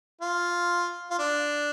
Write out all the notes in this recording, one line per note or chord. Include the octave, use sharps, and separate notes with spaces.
F4
F4
D4